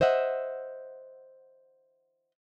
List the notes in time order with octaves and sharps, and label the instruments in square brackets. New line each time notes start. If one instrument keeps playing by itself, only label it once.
[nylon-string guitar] C5 D#5 E5 F#5